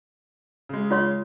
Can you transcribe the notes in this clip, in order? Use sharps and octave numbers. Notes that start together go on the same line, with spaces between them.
C#3 G#3
F4 C#5 C6